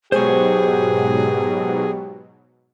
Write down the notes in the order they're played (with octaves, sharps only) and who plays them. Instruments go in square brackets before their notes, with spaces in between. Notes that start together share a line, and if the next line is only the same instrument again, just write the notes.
[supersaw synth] G#2 B2 F#3 [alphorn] G4 [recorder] G#4 [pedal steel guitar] C5 C#6